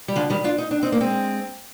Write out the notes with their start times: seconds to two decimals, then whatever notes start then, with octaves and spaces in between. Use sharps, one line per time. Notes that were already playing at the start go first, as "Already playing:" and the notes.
0.08 G3
0.16 D3 F3
0.30 D#3 G3
0.44 D4 F4
0.58 D#4
0.71 D4
0.83 C4 D#4
0.92 A#3
1.01 G#3 C4